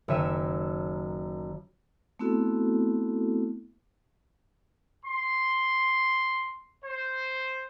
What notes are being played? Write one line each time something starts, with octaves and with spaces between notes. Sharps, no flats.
F#1 D#3 C#5 E5 D#7 E7
A3 B3 C4 E4 F#4 A4
C6
C5